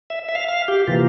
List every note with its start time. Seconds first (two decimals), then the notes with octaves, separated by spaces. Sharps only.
0.10 E5
0.29 E5
0.35 F5
0.48 F5
0.68 G4
0.88 C3 E3 A#3 F4